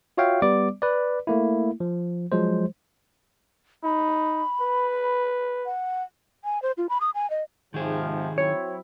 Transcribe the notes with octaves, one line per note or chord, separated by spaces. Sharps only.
F4 F#4 C#5 E5 F5 G5
G3 B3 D5 D6
B4 D5
A3 A#3 E4
F3
F3 F#3 G#3 C5
D#4 B5
B4
F#5
G#5
C5
F4
B5
D#6
G#5
D#5
G#2 C3 D#3 F3 G#4
F#3 C4 E4 C#5